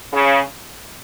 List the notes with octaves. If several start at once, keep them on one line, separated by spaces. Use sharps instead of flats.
C#3